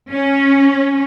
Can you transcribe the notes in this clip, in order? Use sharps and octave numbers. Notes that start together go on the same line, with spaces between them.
C#4